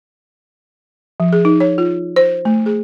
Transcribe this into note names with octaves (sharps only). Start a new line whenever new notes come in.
F3
G#4
D#4
C#5
F4
C5
A3
G#4